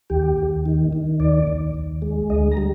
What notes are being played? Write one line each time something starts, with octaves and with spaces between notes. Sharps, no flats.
D#2 G4
D#2
D#3
D#3
D#2 D5
D#2
D#2
G#3
D2 D#5
A#5
G3